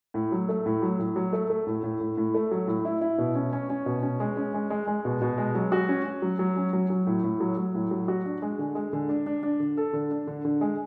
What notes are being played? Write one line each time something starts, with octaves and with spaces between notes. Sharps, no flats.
A2
F#3
A3
A2
F#3
A2
F#3
A3
A3
A2
A2
A2
A2
A3
F#3
A2
E4
E4
B2
C#4
C#4
C#4
B2
C#4
G#3
C#4
G#3
G#3
G#3
B2
B2
G#3
F#3
F#4
C#4
C#4
F#3
F#3
C#4
F#3
F#3
A2
A2
F#3
F#3
A2
F#3
F#4
D4
G#3
D3
G#3
D3
D4
D4
D4
D3
A4
D3
D4
D3
D3
G#3